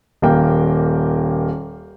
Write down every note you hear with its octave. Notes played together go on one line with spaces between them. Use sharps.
D#1 A#3 G5